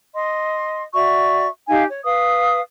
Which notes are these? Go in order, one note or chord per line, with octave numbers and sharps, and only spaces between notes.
D#5 C6
F#4 D5 E5 C#6
D#4 G4 F5 G#5
C#5
B4 F5 D#6